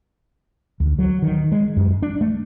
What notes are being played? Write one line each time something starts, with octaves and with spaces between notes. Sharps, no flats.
D2
F#3
D#3
G#3
F#2
D4
A3